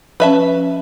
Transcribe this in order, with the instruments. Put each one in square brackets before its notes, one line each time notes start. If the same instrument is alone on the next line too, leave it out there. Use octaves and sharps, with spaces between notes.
[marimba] F3 C#4 [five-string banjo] B4 E5 A5